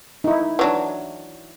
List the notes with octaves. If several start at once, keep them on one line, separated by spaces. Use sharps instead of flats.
D#4 E4
E3 F#3 D4